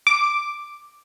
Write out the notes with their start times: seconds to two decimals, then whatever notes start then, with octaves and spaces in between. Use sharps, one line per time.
0.07 D6